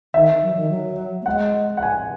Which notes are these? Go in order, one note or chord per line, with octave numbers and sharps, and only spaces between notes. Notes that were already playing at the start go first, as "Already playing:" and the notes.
D#3 E5
F#3
D#3
F#3
A#3
G#3 F#5
F#5
G#5